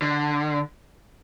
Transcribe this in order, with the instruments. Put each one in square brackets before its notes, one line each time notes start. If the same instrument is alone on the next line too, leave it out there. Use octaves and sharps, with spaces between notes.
[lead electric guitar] D3